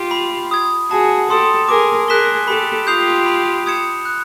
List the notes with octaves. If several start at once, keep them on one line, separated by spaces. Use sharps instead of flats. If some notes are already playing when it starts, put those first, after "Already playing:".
Already playing: F4 G4
B5
D#6 G#6
F#4 G#4 A5
G4 A4 C6 D#6
G#4 A#4 D6
G#4 A#4 F#6 B6 E7 G7
G4 A4 B5
F4 G4 D#6 G6 C7 F7
B5
D#6 G#6 C#7 E7
F#6